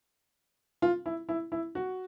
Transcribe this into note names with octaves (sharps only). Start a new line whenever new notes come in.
F4
E4
E4
E4
F#4